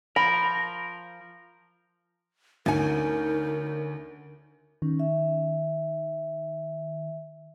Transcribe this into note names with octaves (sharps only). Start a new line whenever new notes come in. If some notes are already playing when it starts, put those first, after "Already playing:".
F3 A#4 B5
D2 C#4 D#4 A#4 G#5
D#3 C#4
E5